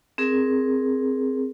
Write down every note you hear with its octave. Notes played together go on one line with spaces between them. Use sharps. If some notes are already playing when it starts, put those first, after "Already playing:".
C4 G#4 A#4